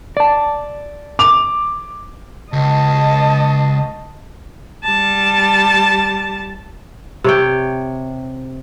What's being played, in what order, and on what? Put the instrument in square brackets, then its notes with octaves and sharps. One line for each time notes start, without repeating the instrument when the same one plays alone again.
[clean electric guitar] D5 A5
[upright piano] D6 F7
[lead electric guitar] C#2 [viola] D#5 A5
[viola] G3 A5
[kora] C3 C#5 G5